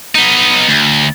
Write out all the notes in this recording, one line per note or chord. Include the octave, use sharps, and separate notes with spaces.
B3 D#4
D2